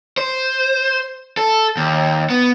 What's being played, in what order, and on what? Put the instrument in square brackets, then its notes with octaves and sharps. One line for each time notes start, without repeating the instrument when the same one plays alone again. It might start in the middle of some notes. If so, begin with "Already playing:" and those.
[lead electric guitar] C5
A4
D#2
B3